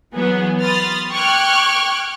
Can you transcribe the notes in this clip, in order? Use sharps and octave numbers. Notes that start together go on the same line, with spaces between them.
E3 F#3 B3 G#4
B5 C6 D#6 F6 A6
G5 C#6 D6 F6 F#6 G#6